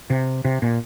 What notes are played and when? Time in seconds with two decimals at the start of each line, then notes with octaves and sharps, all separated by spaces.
0.10 C3
0.45 C3
0.62 A#2